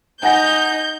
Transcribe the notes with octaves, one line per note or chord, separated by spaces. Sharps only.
D#4 F#5 G#5 G6 A#6